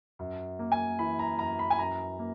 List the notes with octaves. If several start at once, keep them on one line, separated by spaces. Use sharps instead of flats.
F#2
A#3
G#5
E3 B5
A#5
F#2 A#5
B5
G#5
F#2 A#5
A#3